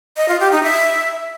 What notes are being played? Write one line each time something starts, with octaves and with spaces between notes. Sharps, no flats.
D#5
F4
G4
D#4
E5